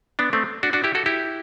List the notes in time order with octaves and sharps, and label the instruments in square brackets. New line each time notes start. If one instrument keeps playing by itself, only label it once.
[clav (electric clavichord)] B3 D4
A3 C4
D4 F#4
D4 F#4
E4 G4
F#4 A4
E4 G4